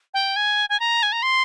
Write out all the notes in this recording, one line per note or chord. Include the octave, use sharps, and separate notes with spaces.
G5
G#5
G#5
A#5
G#5
A#5
C6